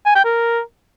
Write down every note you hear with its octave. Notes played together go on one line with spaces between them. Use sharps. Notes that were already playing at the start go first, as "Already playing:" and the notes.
G#5
G5
A#4